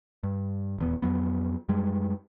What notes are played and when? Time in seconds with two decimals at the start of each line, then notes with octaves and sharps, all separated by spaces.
0.23 G2
0.78 D#1 E2 B3
1.02 F2 F#3 B3
1.69 F#2 G3 G#3